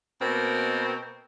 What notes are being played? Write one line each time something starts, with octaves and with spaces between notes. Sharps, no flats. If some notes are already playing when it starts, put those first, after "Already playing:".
B2 A#3 C4 A#4